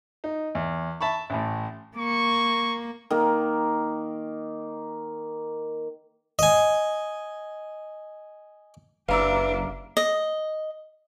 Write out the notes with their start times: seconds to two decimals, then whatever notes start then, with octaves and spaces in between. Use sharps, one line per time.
0.24 D#4
0.55 E2
1.01 E5 A5 B5 C#6
1.30 A1 A2
1.97 A#3 C#6
3.10 D#3 A#3
6.39 D#5 G#5
9.09 F#1 D4 G4 B4 E5 F5 A#5 E6
9.97 D#5